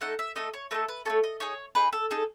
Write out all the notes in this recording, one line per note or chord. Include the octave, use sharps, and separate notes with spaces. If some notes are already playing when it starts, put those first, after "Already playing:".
A3 D#4 A4 F#5
E5
A3 D#4 A4 D#5
C#5
A3 D#4 A4 B4
B4
A3 D#4 A4 C#5
D#5
D#4 G#4 C#5
D#4 G#4 B4
A4
D#4 G#4 A4